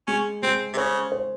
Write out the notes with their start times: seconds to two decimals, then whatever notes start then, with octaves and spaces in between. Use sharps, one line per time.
0.07 G#3 C#4
0.43 G#3 C4
0.73 C3
0.77 C#3 C5
1.12 C5